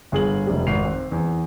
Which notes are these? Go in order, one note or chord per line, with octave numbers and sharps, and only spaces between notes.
G1 G#4 F#7
F1 C3 G3
G#1 C7 F7
C4
E2